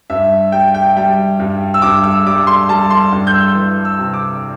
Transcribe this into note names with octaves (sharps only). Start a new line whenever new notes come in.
G2 E5
G3 G5
G5
G3 G5
G2
E6
G2 D6
E6
G3 D6
C6
G3 A5
C6
G2
G6
E6
E3
E6
C3
D6